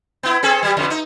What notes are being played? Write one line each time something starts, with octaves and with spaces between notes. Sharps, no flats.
B3 E4
C4 G#4 A4
F#3 G3
F2 B2 D3
D#4